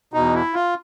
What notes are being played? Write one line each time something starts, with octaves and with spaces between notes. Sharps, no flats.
E2 B2 D#4
E4
F4